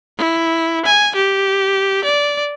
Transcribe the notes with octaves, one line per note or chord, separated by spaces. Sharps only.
E4
G#5
G4
D5